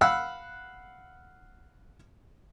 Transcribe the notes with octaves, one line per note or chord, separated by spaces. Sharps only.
F5 F#5 B5 E6 F#6